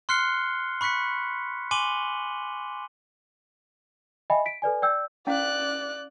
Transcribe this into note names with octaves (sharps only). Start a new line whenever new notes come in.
C6 F6 F#6 C7 C#7 G7
B5 C#6 F#6 B6 C#7
G#5 C6 D6 D#7 F#7 G7
D#5 E5 G5 G#5 B5
B6 D7
A4 B4 D5 G#5
D5 G5 E6 G6
C#4 E4 D5 F5 F#6